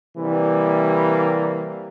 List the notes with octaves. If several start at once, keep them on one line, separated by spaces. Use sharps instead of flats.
C3 E3 G3 A#3